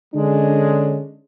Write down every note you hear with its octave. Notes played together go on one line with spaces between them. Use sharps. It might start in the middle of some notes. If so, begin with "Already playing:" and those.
D3 G#3 C#4 D4